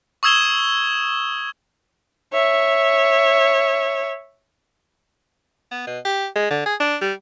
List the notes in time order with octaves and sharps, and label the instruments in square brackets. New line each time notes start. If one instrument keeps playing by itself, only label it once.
[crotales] C#6 D#6 E6 G#6 E7 G7
[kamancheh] C#5 E5
[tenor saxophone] B3
B2
G4
G#3
D3
G#4
D4
G3